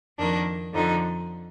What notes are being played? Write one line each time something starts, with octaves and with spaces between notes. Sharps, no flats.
F2 D#3 A#3 D4
F2 D3 F3 D#4